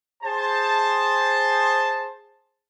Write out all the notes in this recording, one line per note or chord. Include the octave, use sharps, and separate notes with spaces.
G#4 C5 A5